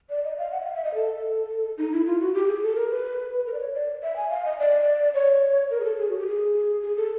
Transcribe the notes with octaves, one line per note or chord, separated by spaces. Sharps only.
D5
D#5
F5
F#5
E5
F5
E5
D#5
A4
D#4
E4
F4
F#4
G4
G#4
A4
A#4
B4
A#4
D5
C#5
D5
E5
G#5
F5
D#5
D5
C#5
A#4
G#4
A4
G#4
F#4
G4
G#4
G#4
A4